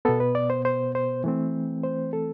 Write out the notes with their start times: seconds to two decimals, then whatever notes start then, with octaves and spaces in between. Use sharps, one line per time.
0.05 B2 B3 A4
0.20 B4
0.35 D5
0.50 C5
0.65 C5
0.95 C5
1.24 E3 A3 C4
1.83 C5
2.13 A4